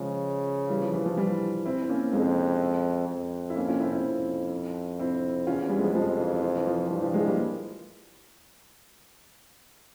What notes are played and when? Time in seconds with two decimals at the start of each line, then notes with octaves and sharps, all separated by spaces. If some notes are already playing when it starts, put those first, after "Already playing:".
Already playing: C#3 F3 G#3
0.69 E3 G3
0.81 F3
0.94 E3
1.06 F3
1.17 E3 G3
1.66 C4 E4
1.83 C4
1.89 A#3 C#4
2.12 F2 G#3 C4
3.09 F2
3.50 E4
3.56 A#3 C#4
3.68 C#4 F4
3.80 C4 E4
3.92 C4 E4
4.04 F2
4.99 C4 E4
5.47 E2 C#4 F4
5.69 G3
5.79 F3 G#3
5.95 F2 F3 G#3
6.19 E3
6.42 F3
6.55 E3
6.67 F3
6.90 G2 E3
7.02 F3
7.14 F3 G#3
7.26 G3 A#3